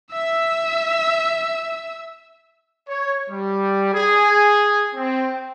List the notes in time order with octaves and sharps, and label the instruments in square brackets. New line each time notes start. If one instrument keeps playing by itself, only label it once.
[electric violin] E5 E6
[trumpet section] C#5
G3
G#4
C4